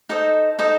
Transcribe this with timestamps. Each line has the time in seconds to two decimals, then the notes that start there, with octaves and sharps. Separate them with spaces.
0.09 D#4 A4 C5 D#5
0.59 D#4 A4 C5 D#5